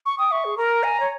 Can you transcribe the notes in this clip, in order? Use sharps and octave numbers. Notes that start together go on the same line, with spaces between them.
C#6
G5 D#6
E5 C#6
G#4
A#4 A#5
G#5
C#5